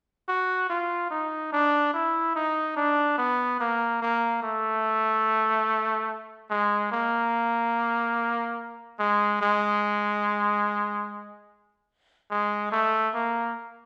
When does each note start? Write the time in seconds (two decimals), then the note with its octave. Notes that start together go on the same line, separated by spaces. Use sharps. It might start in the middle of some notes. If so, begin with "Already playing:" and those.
0.28 F#4
0.69 F4
1.11 D#4
1.52 D4
1.94 E4
2.35 D#4
2.76 D4
3.18 B3
3.60 A#3
4.02 A#3
4.42 A3
6.50 G#3
6.92 A#3
8.99 G#3
9.41 G#3
12.31 G#3
12.72 A3
13.14 A#3